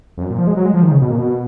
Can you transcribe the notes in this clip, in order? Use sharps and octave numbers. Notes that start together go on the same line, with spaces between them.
F2
F#2
A#2
F3
G#3
F#3
G#3
F3
D#3
C#3
B2
A#2
B2